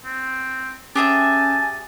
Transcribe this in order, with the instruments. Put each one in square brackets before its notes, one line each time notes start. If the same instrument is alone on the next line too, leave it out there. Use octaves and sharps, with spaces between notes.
[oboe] C4
[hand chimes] C#4 F#6 [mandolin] G4 G#4 E5 [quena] G#5 [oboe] A5